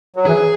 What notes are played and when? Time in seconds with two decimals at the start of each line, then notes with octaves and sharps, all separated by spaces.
0.16 F#3
0.26 E3 G#4